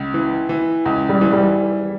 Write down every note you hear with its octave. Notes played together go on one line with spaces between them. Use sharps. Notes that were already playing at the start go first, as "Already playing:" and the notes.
Already playing: C#2
E3
E3
C#2
G3
E3
G3